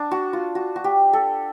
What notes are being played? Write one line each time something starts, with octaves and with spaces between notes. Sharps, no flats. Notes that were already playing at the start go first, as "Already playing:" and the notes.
Already playing: D4
F#4
F4
F#4
F#4
G4
A4